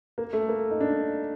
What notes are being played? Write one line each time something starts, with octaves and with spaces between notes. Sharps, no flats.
A#3
A3
A#3
D#4
D4